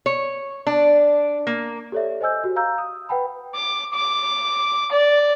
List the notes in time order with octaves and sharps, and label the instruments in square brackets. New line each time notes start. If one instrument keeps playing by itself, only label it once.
[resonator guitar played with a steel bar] C#5
D4
A#3
[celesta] G4 A4 C#5 D5 E5
C5 D#5 G#5 E6 G6
F#4 G4
F5 A#5 E6 G6
D#6
B4 F#5 G5 A5 B5
[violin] D6
D6
D5